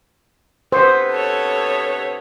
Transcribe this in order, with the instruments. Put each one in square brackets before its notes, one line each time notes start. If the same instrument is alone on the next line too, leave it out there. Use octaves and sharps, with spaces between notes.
[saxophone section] D2 C3 B3 [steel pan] C5
[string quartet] A4 C#5